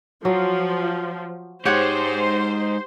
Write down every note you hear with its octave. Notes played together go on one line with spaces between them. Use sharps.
F3 F#3
G#2 D#4 G4 C5 C#5 F#5